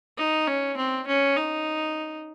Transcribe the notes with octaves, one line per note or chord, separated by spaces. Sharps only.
D#4
C#4
C4
C#4
D#4